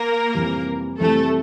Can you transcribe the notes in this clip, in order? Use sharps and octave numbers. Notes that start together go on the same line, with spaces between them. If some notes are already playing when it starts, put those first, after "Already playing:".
Already playing: A#3 A#4
F2 C3 E3 G3
F2 C3 E3 G3 A3 A4